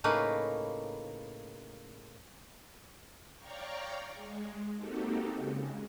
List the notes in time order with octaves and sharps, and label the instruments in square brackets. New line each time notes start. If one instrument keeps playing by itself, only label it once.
[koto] A2 C#3 A#3 D#4 B4
[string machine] C#5 D5 F5 G5 A#5 C#6
G#3
A#3 C4 D#4 F#4 G4 A4
C#3 G#3